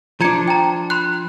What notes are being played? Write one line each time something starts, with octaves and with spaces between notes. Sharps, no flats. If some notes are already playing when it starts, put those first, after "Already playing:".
F3 D4 A#5 G#6 C#7
G5 A#5
B5 C6 F#6